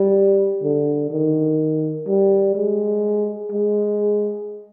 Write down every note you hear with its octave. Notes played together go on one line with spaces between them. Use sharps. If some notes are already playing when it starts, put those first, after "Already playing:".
Already playing: G3
D3
D#3
G3
G#3
G#3